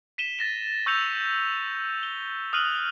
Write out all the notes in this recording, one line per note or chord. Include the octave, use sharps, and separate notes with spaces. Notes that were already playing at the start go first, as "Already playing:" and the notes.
B6 D#7 E7 G7
A6 A#6 E7
C#6 E6 G6 A6 C#7 F7
G7
D#6 F6 F#6 D#7 F#7 G7